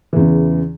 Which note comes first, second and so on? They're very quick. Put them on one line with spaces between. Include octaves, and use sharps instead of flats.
E3 E2 C#3